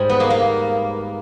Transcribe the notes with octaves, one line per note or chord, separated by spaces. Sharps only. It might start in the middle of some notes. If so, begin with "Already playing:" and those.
Already playing: G#2 G3
B3
A#3
A#3